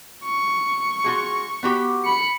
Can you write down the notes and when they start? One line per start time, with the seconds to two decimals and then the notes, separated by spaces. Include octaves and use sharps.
0.25 C#6
1.04 F4 F#4 G#4
1.63 B3 F#4 G4
2.05 B5 C#7